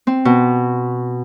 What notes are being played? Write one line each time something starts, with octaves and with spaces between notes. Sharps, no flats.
C4
B2